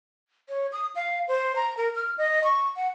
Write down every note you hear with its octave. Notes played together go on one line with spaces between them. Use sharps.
C#5
D#6
F5
C5
A#5
A#4
F6
D#5
C#6
F#5